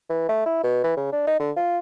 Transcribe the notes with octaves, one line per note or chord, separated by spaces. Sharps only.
E3
A3
E4
B2
E3
C#3
D4
D#4
D3
F4